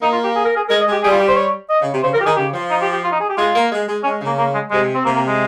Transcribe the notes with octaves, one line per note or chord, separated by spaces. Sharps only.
A#3 D#4
F4
G4
G#4
A#4
G#4
G#3 A#4
D#5
G#3
G4
G3 G#4
F4
G4
C5
C#5
D#5
C#3
C3
C#3 C5
F3 A#4
G4
D#3 G#4
C#3 G4
F3
D#4
G4
G4
F4
D#4
G#4
G4
G#3 F4
A#3
G#3
G#3
G#3 C#4
C#3
A#3
A#3
G#3
C3 G#3
C4
C3 A#3
A#3
G#3